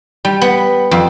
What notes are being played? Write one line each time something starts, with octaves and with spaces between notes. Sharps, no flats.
G3
B3
F2